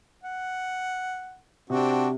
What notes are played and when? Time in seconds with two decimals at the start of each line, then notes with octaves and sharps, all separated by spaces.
0.24 F#5
1.70 C3 C4 D4 F#4